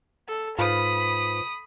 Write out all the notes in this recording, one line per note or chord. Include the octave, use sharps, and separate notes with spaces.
A4
G#2 F4 B4 C5 B5 D#6